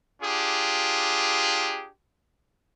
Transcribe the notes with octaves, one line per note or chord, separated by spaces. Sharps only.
D4 F4 G4 G#4